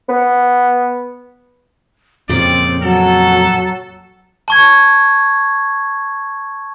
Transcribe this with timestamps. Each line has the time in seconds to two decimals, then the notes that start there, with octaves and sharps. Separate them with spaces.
0.09 B3
2.29 F2 A#2 C#3 C4 D5
2.82 F#3 A4
4.48 A5 C#6 G#6